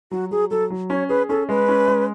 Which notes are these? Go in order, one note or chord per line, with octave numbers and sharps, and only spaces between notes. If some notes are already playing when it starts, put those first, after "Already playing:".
F#3 F#4
F#3 G#4
F#3 A4
F#3
C#4 C#5
G#4 B4
C#4 A4
G#3 B4
C#4
G#3